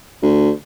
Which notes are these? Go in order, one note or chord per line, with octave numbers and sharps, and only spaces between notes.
D2